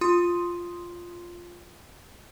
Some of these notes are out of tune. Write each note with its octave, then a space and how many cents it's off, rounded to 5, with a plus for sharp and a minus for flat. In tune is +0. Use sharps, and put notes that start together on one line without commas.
F4 +0 C6 +0 D#6 +0